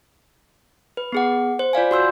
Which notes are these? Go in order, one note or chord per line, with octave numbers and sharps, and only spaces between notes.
B4
B3 G#4 F#5
C5
F4 D5 F5 G#5
F#4 C6 E6 G6